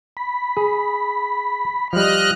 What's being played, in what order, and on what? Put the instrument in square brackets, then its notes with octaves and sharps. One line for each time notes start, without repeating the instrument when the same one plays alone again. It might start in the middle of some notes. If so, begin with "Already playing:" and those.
[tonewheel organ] B5
[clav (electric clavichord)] G#4
[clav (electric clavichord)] F3 G3 [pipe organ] D#5 F6 F#6